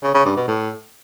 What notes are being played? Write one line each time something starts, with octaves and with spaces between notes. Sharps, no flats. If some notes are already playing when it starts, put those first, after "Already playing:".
C#3
C#3
G2
B2
A2